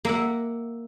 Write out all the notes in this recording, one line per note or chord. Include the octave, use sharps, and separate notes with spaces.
A#3 E5 F#5